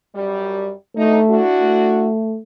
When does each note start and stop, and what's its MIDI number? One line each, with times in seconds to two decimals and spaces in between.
0.14 0.71 42
0.14 0.71 55
0.96 1.19 38
0.96 1.41 57
0.96 1.19 63
1.29 2.08 62
1.29 2.08 64
1.29 2.08 66
1.61 2.39 57